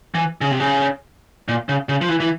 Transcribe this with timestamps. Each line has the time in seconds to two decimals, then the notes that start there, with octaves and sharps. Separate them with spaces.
0.15 E3
0.41 C#3
0.51 C3
0.60 C#3
1.48 A#2
1.69 C#3
1.89 C#3
2.01 F3
2.09 E3
2.20 E3